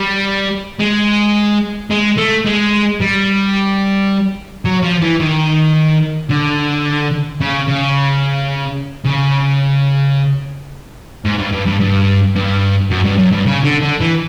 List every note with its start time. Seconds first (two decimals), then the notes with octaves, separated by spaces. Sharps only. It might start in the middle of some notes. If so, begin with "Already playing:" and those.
Already playing: G3
0.80 G#3
1.90 G#3
2.17 A3
2.45 G#3
3.00 G3
4.65 F#3
4.83 F3
5.02 E3
5.20 D#3
6.30 D3
7.41 C#3
7.68 C#3
9.05 C#3
11.25 G#2
11.39 G2
11.53 G2
11.66 G2
11.80 G2
12.35 G2
12.90 F#2
13.04 G2
13.18 F#2
13.32 G2
13.45 C#3
13.63 D3
13.82 D3
14.00 E3